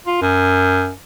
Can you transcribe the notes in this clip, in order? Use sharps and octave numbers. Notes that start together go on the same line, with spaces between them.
F4
F#2